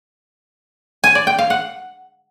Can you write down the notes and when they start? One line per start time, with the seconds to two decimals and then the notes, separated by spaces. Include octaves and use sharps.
1.04 G#5
1.15 D5
1.27 G5
1.39 F5
1.50 F#5